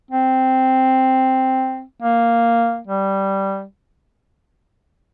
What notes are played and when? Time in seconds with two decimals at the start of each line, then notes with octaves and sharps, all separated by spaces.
0.11 C4
2.02 A#3
2.87 G3